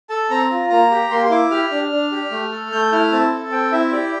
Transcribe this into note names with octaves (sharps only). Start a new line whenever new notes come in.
A4 A5
C4 A#5
F4
A#3 A#5
G4
A#3 C6
C6
E4 D6
G4 F6
D4
D4
G4
A3
A4
A3 G6
E4 F6
C4 A5
A4
C4 G5
E4 E5
E5
G4 D5